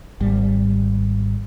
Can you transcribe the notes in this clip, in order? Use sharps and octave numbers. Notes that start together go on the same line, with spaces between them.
G#1 G3